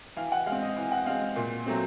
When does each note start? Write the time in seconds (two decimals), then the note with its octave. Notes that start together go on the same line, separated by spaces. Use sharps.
0.17 E3 F5
0.32 F#5
0.46 G#3 F5
0.52 C4
0.62 D#5
0.76 E3
0.92 F#5
1.06 G#3 C4 F5
1.36 A#2
1.66 F#3 A3 C4